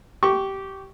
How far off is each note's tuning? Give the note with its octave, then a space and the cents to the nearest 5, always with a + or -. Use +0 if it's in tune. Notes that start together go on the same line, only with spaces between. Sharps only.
G4 -15 C#6 +0